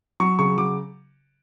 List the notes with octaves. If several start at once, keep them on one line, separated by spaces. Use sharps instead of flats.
F#3 C#6
C#3 C#6
F#3 D6